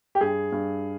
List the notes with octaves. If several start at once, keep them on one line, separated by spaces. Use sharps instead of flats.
G4
G2 G#4
G2